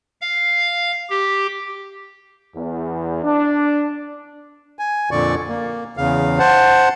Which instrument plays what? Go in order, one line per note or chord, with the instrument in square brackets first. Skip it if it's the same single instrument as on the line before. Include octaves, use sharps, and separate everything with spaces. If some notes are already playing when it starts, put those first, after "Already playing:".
[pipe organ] F5
G4
[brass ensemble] E2
D4
[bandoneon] G#5
F2 A#2 D3 D5 C#6
A#3
E2 C#3 F5
C5 F#5 A5